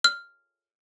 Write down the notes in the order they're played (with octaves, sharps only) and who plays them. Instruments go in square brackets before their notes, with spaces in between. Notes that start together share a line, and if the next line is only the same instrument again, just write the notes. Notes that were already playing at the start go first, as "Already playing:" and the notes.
[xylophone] F6